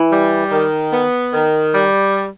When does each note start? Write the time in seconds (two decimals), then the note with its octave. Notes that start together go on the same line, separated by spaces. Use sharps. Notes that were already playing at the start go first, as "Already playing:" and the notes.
Already playing: E3
0.11 G3
0.51 D#3
0.92 B3
1.33 D#3
1.74 G3